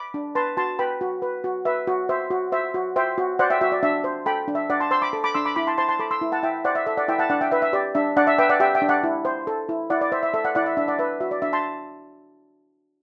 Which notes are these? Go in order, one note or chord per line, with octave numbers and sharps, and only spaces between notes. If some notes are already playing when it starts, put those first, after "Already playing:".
Already playing: B5 D6
D4
B4 A5 C6
F#4 A5 C6
B4 G5 B5
F#4
B4
F#4
B4 E5
F#4
C5 E5
F#4
C5 E5
F#4
C5 E5 G5
F#4
C5 D5 F#5
E5 G5
F#4 E5
D5
D4 E5
C5
A4 G5 B5
D4
E5
D4 D5 F#5
A5 C6
C5 C6 E6
B5 D6
A4
B5 D6
D4 C6 E6
B5 D6
E4 B5 D6
A5 C6
C5 A5 C6
A5 C6
A4 B5 D6
C6 E6
E4
F#5 A5
E4 E5 G5
C5 D5 F#5
E5
A4 E5
D5 F#5
E4 E5 G5
F#5 A5
D4 D5 F#5
E5 G5
B4 E5
E5
G4 D5
D4 E5
D4 D5 F#5
E5
B4 E5 G5
D5 F#5
G4 E5 G5
E5 G5
D4
D5 F#5
E4
C5
A4
E4
E4 D5 F#5
D5
C5 E5
E5
A4 E5
D5 F#5
E4 D5 F#5
E5
D4 E5
D5 F#5
B4 E5
F#4 E5
D5
D4 E5
A5 C6